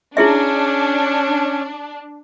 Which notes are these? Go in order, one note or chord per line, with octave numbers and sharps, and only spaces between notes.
C#4 D4 E4 G#4 E5